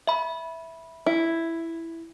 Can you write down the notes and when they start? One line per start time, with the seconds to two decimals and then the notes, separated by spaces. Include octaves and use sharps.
0.07 E5 B5
1.06 E4